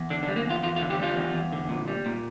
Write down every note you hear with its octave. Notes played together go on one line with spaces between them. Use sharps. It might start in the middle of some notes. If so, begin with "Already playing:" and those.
Already playing: E2
D3 D4
D4
G3
A#3
E2
F4
E2 F4
F4
D3
G4
G3 F4
E2
E2
D3
A#2
G3
A#2